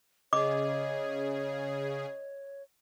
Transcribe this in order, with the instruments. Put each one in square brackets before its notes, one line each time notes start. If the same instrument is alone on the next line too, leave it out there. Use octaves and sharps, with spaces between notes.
[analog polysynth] C#3 G#4 [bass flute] C#5 [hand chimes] D#5 [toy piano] D6